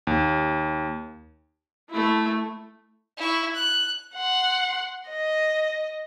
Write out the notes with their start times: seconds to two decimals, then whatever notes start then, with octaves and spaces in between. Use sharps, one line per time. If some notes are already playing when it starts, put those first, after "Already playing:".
0.07 D#2
1.90 A3 E4
3.17 E4 C#6
3.54 F#6
4.15 F#5 C6
5.09 D#5